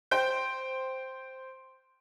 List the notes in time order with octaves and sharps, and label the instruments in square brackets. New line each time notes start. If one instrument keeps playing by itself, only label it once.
[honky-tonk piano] C5 G5 G6